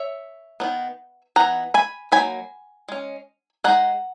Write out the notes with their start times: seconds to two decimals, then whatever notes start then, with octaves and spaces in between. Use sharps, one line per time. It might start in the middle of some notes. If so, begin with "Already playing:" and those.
Already playing: C#5 E5
0.60 D#3 F#3 B3
1.36 E3 B3 D#4 F#5 A#5
1.74 G#5 B5
2.12 F#3 A#3 D#4 G#5 B5
2.88 G#3 C#4
3.64 G#3 D#4 F#5 A#5